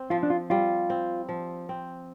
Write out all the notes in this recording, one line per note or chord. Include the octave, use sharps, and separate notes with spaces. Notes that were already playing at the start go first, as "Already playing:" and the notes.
Already playing: C4
F3 F4
D4
F4
G3 F4
C4
F3
C4